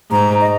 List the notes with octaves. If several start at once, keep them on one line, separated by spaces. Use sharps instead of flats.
G#2 A#5
D#5